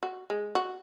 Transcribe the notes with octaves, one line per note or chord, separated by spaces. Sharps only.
F#4
G#3
F#4